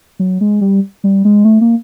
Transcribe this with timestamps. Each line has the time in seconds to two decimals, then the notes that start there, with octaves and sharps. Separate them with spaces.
0.19 F#3
0.41 G#3
0.61 G3
1.04 G3
1.25 G#3
1.44 A3
1.61 A#3